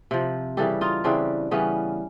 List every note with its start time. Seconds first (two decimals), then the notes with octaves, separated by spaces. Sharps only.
0.11 C3 F3
0.57 C#3 E3 G3 G4 A4
0.81 D#4 F4
1.04 C#3 E3 G3 C4 D4
1.51 C#3 E3 G3 B3 C#4